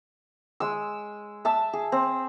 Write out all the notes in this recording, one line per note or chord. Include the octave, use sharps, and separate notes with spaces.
G#3 E6
E5 A5 E6
G#4
C4